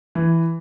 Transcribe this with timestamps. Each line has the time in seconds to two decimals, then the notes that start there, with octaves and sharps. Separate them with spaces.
0.15 E3